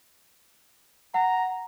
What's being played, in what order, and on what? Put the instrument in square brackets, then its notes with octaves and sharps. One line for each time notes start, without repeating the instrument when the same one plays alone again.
[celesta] F#5 [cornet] A#5